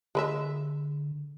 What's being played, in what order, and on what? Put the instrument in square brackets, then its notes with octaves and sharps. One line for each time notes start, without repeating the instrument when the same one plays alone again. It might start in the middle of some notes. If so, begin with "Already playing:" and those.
[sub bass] D3 [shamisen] G#3 B4 E5